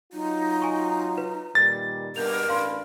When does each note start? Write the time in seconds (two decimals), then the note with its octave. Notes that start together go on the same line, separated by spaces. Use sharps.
0.13 F#3 D#4 F4
0.62 G#5 A#5 C#6
1.18 B4
1.55 A#2 D#3 G3 A6
2.16 G2 B2 A#4 G6 F7
2.49 A1 D4 B4 F5 C6